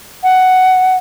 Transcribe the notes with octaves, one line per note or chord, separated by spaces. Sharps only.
F#5